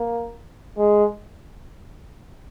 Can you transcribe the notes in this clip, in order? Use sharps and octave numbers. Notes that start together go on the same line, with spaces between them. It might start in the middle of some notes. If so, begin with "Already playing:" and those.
Already playing: A#3
G#3